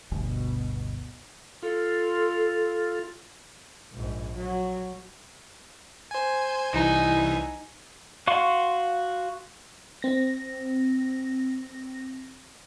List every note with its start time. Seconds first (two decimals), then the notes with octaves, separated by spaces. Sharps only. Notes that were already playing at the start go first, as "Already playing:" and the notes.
0.12 G1 D2 B2
1.63 F4 A4
3.93 A#1 G#2
4.36 F#3
6.11 C5 G#5
6.73 C2 E3 D#4 G#5
8.27 F#4 F5 C6 C#6
10.02 C4 A#6